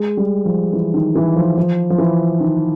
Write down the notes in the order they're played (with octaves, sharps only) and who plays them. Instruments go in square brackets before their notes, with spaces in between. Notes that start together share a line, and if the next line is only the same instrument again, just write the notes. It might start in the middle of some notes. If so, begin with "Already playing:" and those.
Already playing: [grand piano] G#3
G3
F3
E3
D#3
E3
F3
F3
F3
E3
D#3